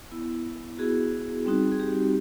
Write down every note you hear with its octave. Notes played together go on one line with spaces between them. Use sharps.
B3 E4
B3 E4 F#4 G#4
G3 C4 D#4 F#4
G#4
G4